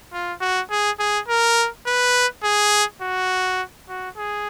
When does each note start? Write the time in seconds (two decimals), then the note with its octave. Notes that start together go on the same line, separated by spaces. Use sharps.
0.13 F4
0.40 F#4
0.70 G#4
0.99 G#4
1.28 A#4
1.86 B4
2.43 G#4
3.02 F#4
3.89 F#4
4.17 G#4